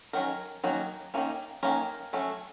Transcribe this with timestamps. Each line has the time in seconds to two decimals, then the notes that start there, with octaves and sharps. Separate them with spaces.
0.13 D#3 F#3 C#4 A#4
0.64 D#3 F#3 A#3 C#4
1.14 D#3 F#3 A#3 C#4
1.63 D#3 F#3 A#3 C#4 A#4
2.13 F#3 A3 C#4